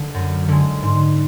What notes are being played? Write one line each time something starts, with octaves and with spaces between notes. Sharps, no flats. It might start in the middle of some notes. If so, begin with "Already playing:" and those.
Already playing: D3
F#2
D3 G#3
G#2